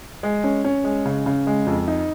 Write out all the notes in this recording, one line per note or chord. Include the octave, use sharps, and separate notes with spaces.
G#3
C#4
C#4
G#3
C#3
C#3
G#3
F2
D#4